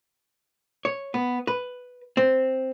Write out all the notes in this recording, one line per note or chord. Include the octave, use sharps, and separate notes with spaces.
C#5
B3
B4
C4